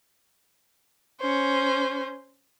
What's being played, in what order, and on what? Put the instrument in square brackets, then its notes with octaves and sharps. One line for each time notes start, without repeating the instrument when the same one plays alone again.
[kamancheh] C#4 C5